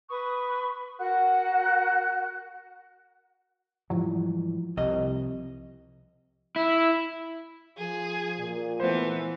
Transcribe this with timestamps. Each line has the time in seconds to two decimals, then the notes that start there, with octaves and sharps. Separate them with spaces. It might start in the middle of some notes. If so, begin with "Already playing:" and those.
0.09 B4 C#6 D#6
0.99 F#4 A#4 F#5 F#6
3.90 G#2 E3 F3 G3
4.77 C2 C3 D#5
6.56 E4
7.78 F3 G#4
8.38 A#2
8.80 E3 A3 B3 C5